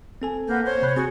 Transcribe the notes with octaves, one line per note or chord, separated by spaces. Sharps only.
C4 A4 G#5
A#3 B4 F#5 G6
C5 C#5
C3 B5 F#6
C4 F#4 G#4